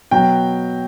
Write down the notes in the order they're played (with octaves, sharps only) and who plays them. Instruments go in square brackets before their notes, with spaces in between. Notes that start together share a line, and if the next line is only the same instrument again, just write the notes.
[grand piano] B2 F#3 G5